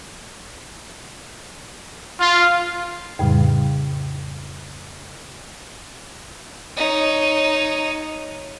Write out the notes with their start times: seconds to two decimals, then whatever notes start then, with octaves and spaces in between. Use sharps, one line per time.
2.20 F4
3.19 F2 A2 C#3 G3
6.77 D#4 C#5